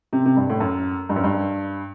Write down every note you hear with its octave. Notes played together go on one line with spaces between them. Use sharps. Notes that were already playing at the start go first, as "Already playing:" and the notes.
C3
C3
G2
A2
F#2
G2
F#2
G2